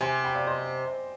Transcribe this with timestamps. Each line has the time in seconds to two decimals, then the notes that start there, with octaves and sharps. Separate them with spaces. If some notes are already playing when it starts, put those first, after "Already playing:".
0.01 C3 G#5 C6
0.24 G5 B5
0.35 D5 F5
0.46 C5 D#5